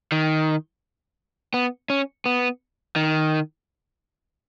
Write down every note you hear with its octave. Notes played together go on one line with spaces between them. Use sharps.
D#3
B3
C#4
B3
D#3